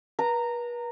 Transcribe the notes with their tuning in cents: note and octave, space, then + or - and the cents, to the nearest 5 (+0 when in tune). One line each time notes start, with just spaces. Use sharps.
B4 -40 A#5 -15